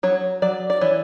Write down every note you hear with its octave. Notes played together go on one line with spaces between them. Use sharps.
F#3 C#5
F#3 D5
D5
E3 C#5